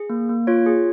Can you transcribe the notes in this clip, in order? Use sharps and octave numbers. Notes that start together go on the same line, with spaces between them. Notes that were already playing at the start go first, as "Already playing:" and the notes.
Already playing: G#4
A#3
A#3
F4 C#5
G#4